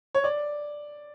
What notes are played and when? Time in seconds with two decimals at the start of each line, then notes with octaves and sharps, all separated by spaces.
0.15 C#5
0.24 D5